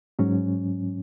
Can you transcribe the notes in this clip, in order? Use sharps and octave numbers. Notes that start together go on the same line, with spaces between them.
G#2 F#3 C#4